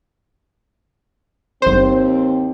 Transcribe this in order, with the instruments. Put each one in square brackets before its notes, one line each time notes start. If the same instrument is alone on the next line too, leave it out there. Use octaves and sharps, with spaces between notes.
[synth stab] G1 C5 [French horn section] D#2 C4